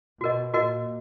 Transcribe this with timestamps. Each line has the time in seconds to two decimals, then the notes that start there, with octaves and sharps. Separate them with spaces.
0.21 B2 F#4 A#4 D#5
0.53 A#2 F#4 A#4 D#5